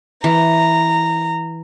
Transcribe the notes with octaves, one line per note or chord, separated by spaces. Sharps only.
E3 A#5